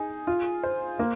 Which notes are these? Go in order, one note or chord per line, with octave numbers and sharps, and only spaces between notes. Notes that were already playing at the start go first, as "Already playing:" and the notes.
Already playing: D#4 G#4
F4
C5
A#3